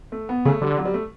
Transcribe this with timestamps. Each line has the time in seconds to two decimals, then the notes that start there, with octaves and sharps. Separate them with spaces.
0.12 A3
0.29 B3
0.45 C#3 A3
0.61 D3 G3
0.78 F#3
0.85 G3
0.94 A3